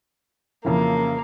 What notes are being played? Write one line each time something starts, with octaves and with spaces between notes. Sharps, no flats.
F2 C#3 E3 A#3